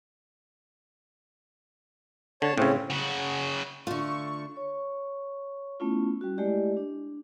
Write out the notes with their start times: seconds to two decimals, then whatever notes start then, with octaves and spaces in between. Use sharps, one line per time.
2.42 D3 C#5 A5
2.58 A2 C#3 C4 C#4
2.90 C#3 F#4
3.87 D3 A3 F4 C#6
4.56 C#5 C#6
5.80 A3 B3 C#4 E4 F4
6.21 G3 C#4 F#4
6.37 G#3 A3 E4 G4 D5 D#5
6.77 D4